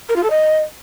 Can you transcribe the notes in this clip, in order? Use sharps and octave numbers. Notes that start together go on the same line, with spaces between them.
A#4
F4
A4
D#5